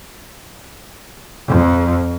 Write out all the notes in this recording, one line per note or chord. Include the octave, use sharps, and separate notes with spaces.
F2